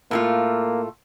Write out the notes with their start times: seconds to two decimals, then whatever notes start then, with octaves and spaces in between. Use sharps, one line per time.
0.11 A2 A3 A#3 F4